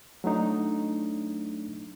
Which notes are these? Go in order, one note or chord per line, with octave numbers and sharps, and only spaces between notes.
F#3 A3 D4 D#4